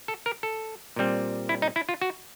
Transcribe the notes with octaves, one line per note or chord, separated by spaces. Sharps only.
A4
A#4
A4
A#2 G3 C4
E4
D#4
E4
F4
F#4